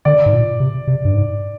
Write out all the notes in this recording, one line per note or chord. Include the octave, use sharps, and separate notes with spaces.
D3 D5
G#2
A#2
C3
C3
G2
G#2